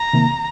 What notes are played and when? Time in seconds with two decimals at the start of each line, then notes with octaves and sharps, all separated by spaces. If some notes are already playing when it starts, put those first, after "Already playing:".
Already playing: A#5
0.13 C3 D#3 A#3